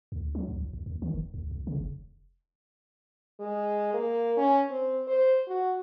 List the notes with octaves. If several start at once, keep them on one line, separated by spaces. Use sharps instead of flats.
D2
F#3
C#2
A#1
B1
D#2
D#3
E1
D2
C2
C#3
F1
G#3
A#3
C#4
C4
C5
F#4